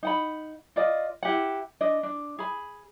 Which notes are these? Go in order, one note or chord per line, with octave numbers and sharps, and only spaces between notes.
D#4 F#5 B5
F4 D5 D#5
E4 G4 F#5
D4 D#5
D4
G#4 B5